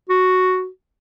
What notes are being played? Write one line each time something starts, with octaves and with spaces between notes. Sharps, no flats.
F#4